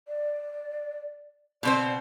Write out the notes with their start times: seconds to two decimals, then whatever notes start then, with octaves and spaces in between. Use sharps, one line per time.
0.08 D5
1.63 B2 C4 C5 D5